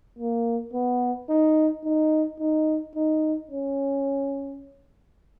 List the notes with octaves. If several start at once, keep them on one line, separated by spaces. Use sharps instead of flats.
A#3
B3
D#4
D#4
D#4
D#4
C#4